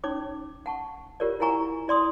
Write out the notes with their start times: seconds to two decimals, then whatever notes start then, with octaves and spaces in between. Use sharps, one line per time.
0.04 C#4 D#4 C#5 D6
0.66 F#5 A5 C#6
1.20 F4 G4 A#4 C#5 D5
1.40 E4 A#4 F#5 G#5 A#5 C#6
1.88 E4 D5 C6 D#6